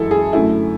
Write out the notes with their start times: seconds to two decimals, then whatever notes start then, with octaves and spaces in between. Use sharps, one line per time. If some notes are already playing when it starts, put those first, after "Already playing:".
Already playing: F#2 E3 G#3 E4 A4
0.11 G#4
0.33 F#2 D3 A3 E4